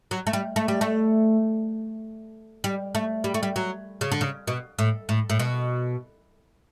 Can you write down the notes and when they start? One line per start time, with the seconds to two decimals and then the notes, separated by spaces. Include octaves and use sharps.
0.11 F#3
0.27 A3
0.33 G3
0.56 A3
0.68 G3
0.81 A3
2.64 G3
2.95 A3
3.24 G3
3.34 A3
3.43 G3
3.56 F#3
4.01 C#3
4.12 D3
4.21 C#3
4.47 B2
4.79 A2
5.09 A2
5.30 A2
5.39 B2